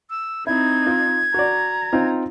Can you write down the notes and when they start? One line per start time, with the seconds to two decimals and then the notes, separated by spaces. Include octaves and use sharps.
0.10 E6
0.47 C4 D#4 E4 G#6
0.87 F4
1.34 F#4 D5 A#5
1.93 C4 D#4 F4